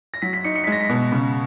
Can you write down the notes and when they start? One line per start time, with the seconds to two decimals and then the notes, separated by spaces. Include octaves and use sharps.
0.14 A#6
0.22 F#3 B6
0.33 B6
0.44 D#4 C#7
0.56 C#7
0.64 B6
0.67 G#3 A#6
0.81 B6
0.90 B2
1.12 C#3